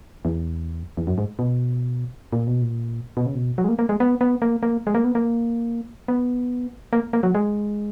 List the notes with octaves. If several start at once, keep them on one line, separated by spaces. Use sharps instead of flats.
E2
E2
F#2
G#2
B2
A#2
B2
A#2
B2
C#3
B2
F#3
G#3
A#3
A#3
G#3
B3
B3
A#3
A#3
G#3
A#3
B3
A#3
B3
A#3
A#3
F#3
G#3